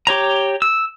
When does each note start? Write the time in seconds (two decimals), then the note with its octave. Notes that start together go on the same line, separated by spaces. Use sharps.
0.07 G4 C#5 A#5
0.62 E6